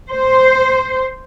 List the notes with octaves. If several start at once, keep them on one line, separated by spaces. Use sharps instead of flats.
C5